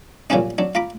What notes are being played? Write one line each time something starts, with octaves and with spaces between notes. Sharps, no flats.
A#2 C#3 F#3 G3 C#4 D4
F#3 D4
F4 A#5 B5 D6